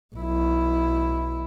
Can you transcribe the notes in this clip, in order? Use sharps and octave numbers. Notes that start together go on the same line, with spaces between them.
B1 E4